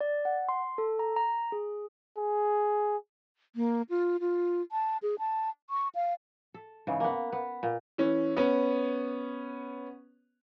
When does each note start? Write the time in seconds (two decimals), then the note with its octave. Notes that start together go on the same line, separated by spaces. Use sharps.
0.01 D5
0.25 F#5
0.49 C6
0.78 A4
0.99 A#5
1.16 A#5
1.52 G#4
2.17 G#4
3.56 A#3
3.90 F4
4.20 F4
4.72 A5
5.03 G#4
5.19 A5
5.70 C#6
5.95 F5
6.54 A4
6.87 G#2 C#3 E3
7.00 A#3 B3
7.32 B3
7.63 A#2
7.98 E3 C#4
8.37 B3 C#4